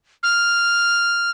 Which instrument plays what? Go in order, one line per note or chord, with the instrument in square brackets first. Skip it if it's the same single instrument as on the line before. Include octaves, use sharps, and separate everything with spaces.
[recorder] F6